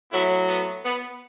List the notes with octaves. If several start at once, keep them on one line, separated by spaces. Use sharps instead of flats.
A2 F#3 B3 E4
B3
B3